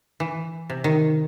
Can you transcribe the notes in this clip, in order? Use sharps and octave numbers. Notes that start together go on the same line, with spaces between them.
E3
C3
D#3